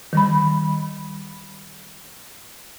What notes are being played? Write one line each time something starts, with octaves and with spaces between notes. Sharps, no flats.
D#3 G3 B5